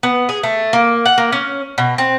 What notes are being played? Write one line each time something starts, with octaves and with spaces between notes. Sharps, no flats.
B3
G#4
A3
A#3
F#5
A#3
C#4
B2
C4